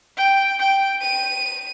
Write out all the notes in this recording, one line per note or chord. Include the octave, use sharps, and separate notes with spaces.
G5
G5
D#7